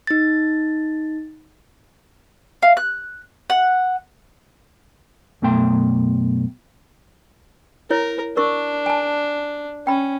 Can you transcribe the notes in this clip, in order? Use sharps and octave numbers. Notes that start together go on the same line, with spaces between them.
D#4 A6
F5
F#6
F#5
F#2 B2 A3 G5 C6
E4 A#4 C#5
D4 A#4 C#6
G#5 A5
C#4 G5 B5